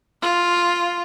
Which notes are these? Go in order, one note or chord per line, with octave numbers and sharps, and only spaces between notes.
F4